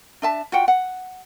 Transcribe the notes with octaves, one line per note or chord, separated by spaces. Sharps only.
D4 E5 A5
F4 F#4 F#5 G5
F#5